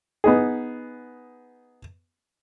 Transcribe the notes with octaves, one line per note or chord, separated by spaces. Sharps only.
B3 D#4 G#4